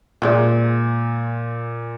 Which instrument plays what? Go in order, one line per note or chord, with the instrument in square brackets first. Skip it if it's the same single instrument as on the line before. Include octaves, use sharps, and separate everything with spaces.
[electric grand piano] A#2 [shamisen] F3 G#3 D5